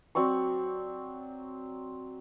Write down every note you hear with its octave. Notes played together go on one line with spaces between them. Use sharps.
F#3 C4 D5 C#6